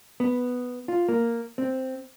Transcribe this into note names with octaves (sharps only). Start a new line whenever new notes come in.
B3
F4
A#3
C4